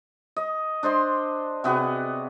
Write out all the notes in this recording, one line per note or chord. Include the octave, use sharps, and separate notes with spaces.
D#5
D4 C5 D#5 C6
C3 B3 F#4 G#4